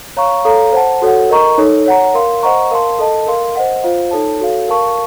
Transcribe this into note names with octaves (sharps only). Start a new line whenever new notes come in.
C#5 F5 A#5 C#6
A4 C#5 F5 A#5
C5 F#5 A5
F#4 A4 C#5 F#5
A#4 D#5 A#5 C#6
D#4 A4 C#5
C#5 F#5 A#5
A#4 F5 C6
C5 D#5 F#5 A#5 C#6
A#4 F5 A5 C6
A4 D#5 A5
A#4 F5 C6
C5 D#5 F#5
F4 C5 F5
D#4 A4 C#5 A5
F#4 A4 C#5 F5
A#4 F5 A5 C#6